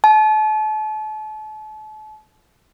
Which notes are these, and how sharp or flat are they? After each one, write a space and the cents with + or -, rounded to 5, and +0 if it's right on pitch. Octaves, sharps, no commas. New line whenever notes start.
A5 -35